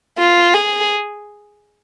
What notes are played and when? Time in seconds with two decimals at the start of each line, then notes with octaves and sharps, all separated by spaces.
0.19 F4
0.54 G#4